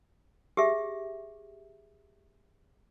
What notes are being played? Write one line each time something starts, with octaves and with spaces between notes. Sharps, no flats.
G4 G#4 E5